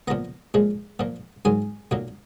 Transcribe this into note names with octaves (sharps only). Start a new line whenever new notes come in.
A#2 F3 B3 A#5
A#2 F3 G#3
A#2 F3 A#3
G#2 D#3 F#3 G#5
B1 A#2 F#3 A#3